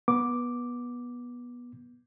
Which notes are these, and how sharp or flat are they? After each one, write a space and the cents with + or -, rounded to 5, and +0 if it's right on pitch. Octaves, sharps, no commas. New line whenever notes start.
B3 -20 D6 +0